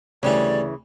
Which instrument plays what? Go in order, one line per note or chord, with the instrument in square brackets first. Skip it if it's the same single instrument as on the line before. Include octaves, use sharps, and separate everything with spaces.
[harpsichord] D2 G3 C#4 [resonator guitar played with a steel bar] C#3 E3 [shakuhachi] D5